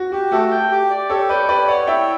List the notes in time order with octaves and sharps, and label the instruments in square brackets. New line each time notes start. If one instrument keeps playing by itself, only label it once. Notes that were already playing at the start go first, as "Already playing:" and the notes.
Already playing: [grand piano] F#4
[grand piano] F#4 [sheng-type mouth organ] G4
[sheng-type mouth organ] A3 [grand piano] F#4 A4
[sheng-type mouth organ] G5
G4
D5
[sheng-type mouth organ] G4 [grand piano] A4 C#5
[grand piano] B4 D5 [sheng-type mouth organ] G5
[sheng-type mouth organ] G4 [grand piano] B4 D5
[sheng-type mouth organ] C#5 [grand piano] D5 F#5
[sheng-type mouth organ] E4 [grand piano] E5 G5